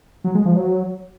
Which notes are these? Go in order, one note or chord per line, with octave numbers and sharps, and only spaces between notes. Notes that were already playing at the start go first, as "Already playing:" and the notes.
F#3
G#3
F3
F#3